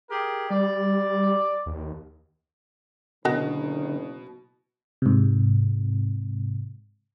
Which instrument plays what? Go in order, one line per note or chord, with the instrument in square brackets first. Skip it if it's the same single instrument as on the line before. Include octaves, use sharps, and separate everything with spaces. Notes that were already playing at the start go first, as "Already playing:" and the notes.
[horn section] G4 G#4 A#4
[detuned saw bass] G3 [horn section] D5
[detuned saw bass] D#2
[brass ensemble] F#1 D#3 [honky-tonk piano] B2 [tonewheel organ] D3 [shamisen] F#4 A#4 D#5
[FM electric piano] G#2 C3